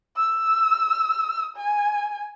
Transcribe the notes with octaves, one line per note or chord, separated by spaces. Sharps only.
E6
G#5